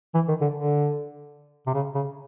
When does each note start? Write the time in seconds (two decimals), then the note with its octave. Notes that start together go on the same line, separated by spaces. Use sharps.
0.15 E3
0.28 D#3
0.41 D3
0.55 D3
1.67 C3
1.74 C#3
1.95 C#3